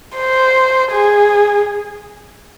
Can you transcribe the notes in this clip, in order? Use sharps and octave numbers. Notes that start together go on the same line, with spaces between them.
C5
G#4